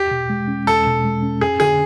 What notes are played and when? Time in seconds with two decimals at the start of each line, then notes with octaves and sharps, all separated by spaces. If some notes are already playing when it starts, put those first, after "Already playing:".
Already playing: E2 G4
0.11 B2
0.29 G#3
0.48 C#4
0.67 E2 A4
0.86 B2
1.05 G#3
1.22 C#4
1.41 F2 G#4
1.60 D3 G#4